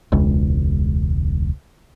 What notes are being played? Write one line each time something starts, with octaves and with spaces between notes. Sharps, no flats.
E1 C#2